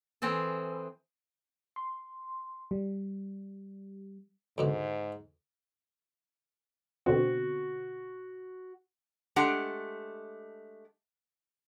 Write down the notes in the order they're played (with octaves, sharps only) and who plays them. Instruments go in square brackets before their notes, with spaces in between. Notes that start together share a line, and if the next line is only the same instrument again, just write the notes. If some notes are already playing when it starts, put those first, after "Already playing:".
[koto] E3 C4 G#4 A4
[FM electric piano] C6
G3
[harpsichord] C#2 B2 D3 [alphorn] G#2
[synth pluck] B2 D3 C4 [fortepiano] F#4
[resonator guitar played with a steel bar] G#3 A3 D4 G4 F#5